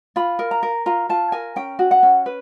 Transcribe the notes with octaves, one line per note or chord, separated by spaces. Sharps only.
F4 B5
A#4
A#5
A#4
F4 A#5
F4 A5
A#4 G#5
C#4 G5
F#4
F#5
C#4
B4